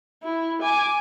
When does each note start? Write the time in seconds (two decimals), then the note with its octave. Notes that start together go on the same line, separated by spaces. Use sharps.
0.23 E4
0.62 G#5 D6